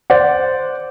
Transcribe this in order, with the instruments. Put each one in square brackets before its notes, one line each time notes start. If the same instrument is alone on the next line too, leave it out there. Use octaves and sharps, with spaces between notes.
[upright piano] C5 D5 F#5